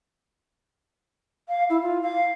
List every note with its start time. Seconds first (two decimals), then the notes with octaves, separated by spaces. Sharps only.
1.49 F5
1.70 E4
1.82 F4
2.02 F5